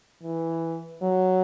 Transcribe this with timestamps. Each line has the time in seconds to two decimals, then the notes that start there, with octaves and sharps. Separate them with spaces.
0.23 E3
1.02 F#3